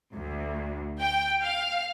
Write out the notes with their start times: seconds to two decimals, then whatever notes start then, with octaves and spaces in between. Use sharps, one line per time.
0.14 D2
0.99 G5
1.43 F5